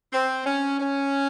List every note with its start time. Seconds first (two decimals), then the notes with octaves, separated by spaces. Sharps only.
0.12 C4
0.45 C#4
0.80 C#4